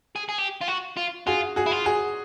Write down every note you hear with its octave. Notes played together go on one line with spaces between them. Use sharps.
G#4
G#4
G4
F4
F#4
F4
F4 F#4 G#4
F#4 G#4
E4
F4
F#4 G#4